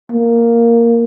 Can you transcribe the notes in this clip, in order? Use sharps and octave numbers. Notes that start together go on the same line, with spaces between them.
A#3